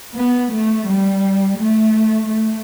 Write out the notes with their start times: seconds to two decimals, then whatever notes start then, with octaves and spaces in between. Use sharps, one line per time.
0.17 B3
0.53 A3
0.89 G3
1.59 A3
2.30 A3